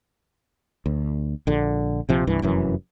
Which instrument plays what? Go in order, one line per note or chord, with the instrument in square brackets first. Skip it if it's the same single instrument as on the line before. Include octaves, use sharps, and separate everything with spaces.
[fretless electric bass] D2
A#1 D3
A#1 C3 F3
C2 G2 E3
F1 F#2 E3